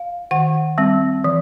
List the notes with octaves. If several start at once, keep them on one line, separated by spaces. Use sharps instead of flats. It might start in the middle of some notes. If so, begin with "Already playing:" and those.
Already playing: F5
D#3 F#5
G3 C4
E3